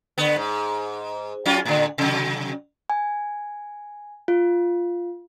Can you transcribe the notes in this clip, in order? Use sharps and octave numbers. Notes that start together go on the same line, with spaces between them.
D3 B3
G#2
F#3 C#4 F4
A2 D3
C3 F#3
G#5
F4